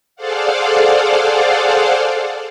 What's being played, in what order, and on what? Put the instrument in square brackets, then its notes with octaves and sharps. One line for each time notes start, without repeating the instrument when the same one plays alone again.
[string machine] G#4 A4 C5 D5 F5 F#5